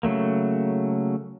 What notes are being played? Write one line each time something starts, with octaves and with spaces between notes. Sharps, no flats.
C#3 F#3 A3 A#3